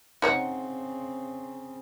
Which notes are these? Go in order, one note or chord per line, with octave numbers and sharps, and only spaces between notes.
C#3 C4 D#4 C#5 F#5